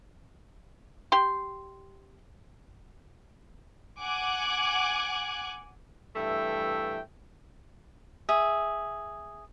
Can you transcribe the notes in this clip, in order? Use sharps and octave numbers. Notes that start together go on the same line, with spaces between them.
G4 C6
F#5 G#5 D6 F#6 G#6
G2 E3 A3 E5 G5
G#4 E5